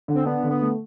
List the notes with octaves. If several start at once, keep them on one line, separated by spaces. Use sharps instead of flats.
D3
C4
B3 D4
D3
B3
A3